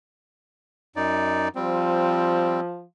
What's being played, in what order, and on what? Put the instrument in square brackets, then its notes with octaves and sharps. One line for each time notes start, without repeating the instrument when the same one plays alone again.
[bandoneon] F#2 D#4 D5
[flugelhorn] F3 [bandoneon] G3 C4